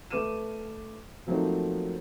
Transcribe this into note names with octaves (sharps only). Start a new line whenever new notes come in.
A3 B4 D6 F6 D#7 E7
F3 F#3 A3 A#3 C4 D#4